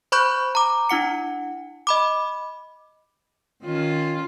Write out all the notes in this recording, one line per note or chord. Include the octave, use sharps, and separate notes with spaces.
C5 B5 C#6 F#6 G6
A#5 D6
D4 E4 F#5 C#7
D#5 B5 D6
D#3 C#4 F4